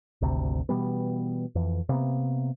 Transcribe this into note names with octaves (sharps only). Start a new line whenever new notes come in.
G#1 D2 C3
B2 E3 G3 B3
F2 E3
C3 A#3 B3